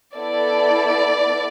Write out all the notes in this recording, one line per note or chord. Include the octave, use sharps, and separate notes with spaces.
B3 E4 A4 D5